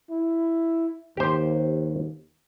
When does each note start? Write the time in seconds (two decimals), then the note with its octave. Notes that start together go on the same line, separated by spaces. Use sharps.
0.11 E4
1.17 D#2 G4 C5